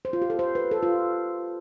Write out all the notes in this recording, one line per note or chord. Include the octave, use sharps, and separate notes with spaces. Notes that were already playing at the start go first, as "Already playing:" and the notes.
C5
F4
G4
A4
C5
B4
A4
F4